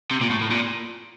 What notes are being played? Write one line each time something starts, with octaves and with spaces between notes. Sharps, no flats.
C3
A#2
A2
A2
A#2